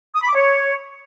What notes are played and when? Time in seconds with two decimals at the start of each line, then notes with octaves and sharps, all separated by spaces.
0.15 D#6
0.22 B5
0.28 D6
0.35 C#5